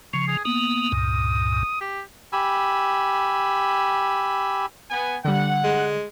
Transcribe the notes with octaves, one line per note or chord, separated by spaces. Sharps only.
C#3 F3 C#6
G#4
A#3 B3 D#6
C#2 G2 A#2
G4
G4 G#5 B5 E6
B3 G#5
D3 G3 F#5
G#3